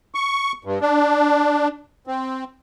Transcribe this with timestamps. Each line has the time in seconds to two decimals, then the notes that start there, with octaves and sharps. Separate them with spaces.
0.15 C#6
0.65 G2
0.81 D4
2.07 C4